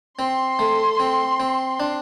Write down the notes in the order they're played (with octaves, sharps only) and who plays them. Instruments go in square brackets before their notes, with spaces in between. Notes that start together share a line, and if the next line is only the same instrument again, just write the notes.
[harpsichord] C4 [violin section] C6
[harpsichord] A3
C4
C4
D4